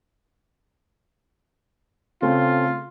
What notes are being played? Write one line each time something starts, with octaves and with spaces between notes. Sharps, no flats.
C#3 A3 C4 F4